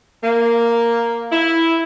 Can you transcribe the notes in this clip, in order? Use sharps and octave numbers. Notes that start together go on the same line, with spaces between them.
A#3
E4